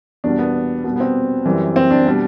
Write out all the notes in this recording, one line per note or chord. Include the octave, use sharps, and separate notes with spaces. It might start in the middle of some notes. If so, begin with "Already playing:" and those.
E2 B2 G3 D4
B3
B2 G3 B3
B3
C4
F#2 E3 G3
C4
D4
B2 G3